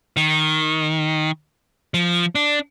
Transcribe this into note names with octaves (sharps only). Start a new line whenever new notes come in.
D#3
F3
D4